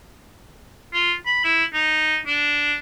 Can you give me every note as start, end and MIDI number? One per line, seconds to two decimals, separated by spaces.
0.94 1.13 65
1.26 1.41 83
1.44 1.64 64
1.73 2.17 63
2.27 2.79 62